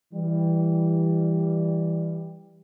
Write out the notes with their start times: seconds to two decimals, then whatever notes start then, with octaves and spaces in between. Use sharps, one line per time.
0.14 E3 G3